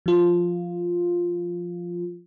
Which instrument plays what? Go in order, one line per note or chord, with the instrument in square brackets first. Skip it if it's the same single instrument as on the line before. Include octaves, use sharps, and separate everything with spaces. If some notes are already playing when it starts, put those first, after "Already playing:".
[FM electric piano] F3 F4